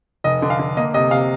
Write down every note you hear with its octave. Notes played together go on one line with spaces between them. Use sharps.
F1 D#5
D3
F5
D3
A#3 D#5
C3 D#5
C3 F5